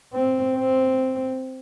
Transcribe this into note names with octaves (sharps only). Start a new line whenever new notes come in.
C4
C4